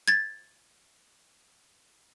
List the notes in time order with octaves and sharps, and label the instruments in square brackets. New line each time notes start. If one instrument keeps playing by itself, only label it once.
[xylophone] G#6 A6